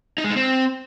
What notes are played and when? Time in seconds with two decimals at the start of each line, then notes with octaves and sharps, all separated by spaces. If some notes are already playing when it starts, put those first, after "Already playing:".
0.18 D#4
0.24 G#3
0.30 D#4
0.36 C4